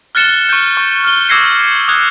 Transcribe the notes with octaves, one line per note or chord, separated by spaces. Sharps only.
F6 F#6 A6 C#7 E7 G7
C#6 G6
C#6
F6 G7
D6 E6 G#6 A#6 C7 C#7
D#6 F#6 G#6